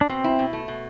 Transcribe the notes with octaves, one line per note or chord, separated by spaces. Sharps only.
D4
B2 C4
E4
B2
A3
B2